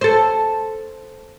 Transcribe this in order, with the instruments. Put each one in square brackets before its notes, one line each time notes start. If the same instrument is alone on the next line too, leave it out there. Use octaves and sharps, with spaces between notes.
[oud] A4 C5